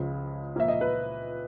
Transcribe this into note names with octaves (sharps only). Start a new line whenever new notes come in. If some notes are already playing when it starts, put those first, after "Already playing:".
Already playing: C#2 C#3 F3 G#3
A#2 F3 A#3 E5
D#5
B4